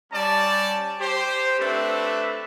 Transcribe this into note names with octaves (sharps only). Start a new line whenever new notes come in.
G3 C#4 D5 A5
G4 C5
A3 C4 D4 A4 B4 E5